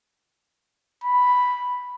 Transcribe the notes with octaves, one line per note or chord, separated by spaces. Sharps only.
B5